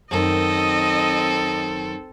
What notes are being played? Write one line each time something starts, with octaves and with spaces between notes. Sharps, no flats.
F#2 D#3 C4 A4 D#5